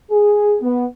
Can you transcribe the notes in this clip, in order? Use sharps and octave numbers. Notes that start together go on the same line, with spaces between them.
G#4
B3